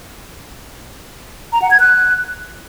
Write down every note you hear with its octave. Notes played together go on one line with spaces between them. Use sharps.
A#5
F#5
G#6
F#6